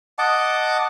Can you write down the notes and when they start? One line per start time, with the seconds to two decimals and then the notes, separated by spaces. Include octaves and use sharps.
0.19 D#5 F#5 A5 D6